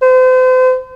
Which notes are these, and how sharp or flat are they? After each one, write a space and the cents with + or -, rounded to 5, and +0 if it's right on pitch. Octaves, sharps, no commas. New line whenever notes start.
C5 -40